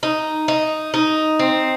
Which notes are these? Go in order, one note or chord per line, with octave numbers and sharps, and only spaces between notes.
D#4
D#4
D#4
C4